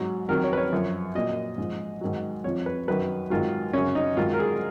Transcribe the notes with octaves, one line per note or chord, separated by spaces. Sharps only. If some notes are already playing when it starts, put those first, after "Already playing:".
Already playing: G#2 F#3
F2 D#3 F#3 A#4
C#5
B4
C#5
F#2 F3
A#2 F#3 D#5
G#2 F3
G#2 D#3 F#3
F2 F3 C#5
B4
F#2 D#3 F#3 B4
G#2 D#3 F#3 F4
F#2 C#3 F#3 C#4
D#4
G#2 D#3 F#3 F4
A#4
G#4